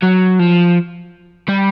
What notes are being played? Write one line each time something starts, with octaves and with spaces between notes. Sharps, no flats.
F#3
F3
G3